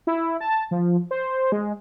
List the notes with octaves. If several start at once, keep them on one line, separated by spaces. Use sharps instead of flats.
E4
A5
F3
C5
G#3